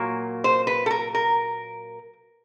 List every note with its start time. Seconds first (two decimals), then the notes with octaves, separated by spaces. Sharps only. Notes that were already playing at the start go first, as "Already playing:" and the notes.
Already playing: A#2 F#3 A#3
0.44 C5
0.67 B4
0.86 A4
0.91 A#4
1.15 A#4